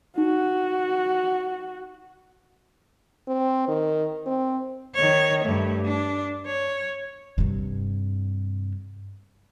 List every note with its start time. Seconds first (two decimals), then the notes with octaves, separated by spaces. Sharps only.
0.18 D#4 F#4
3.28 C4
3.68 D#3
4.26 C4
4.95 D#3 C#5
5.44 G2 A3
5.85 D4
6.46 C#5
7.38 G2 C3